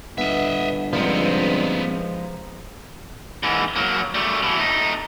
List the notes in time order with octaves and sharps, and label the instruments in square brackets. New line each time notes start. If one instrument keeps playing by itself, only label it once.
[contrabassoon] G1 [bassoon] B3 [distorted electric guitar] D#5 E5
[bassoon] G2 [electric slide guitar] F3 G#3 D#4 [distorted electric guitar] B3 C4
[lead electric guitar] G#2 E3
F#3 A#3
G3 A3
B2 E3
A3 D#4